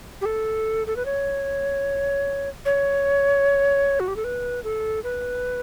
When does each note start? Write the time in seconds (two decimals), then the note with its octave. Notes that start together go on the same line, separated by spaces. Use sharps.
0.21 G4
0.25 A4
0.87 A4
0.96 B4
1.06 C#5
2.65 C#5
4.00 F#4
4.08 G4
4.16 A4
4.24 B4
4.64 A4
5.04 B4